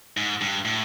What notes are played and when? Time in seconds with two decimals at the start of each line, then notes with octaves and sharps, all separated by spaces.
0.17 G#2
0.41 G2
0.65 A2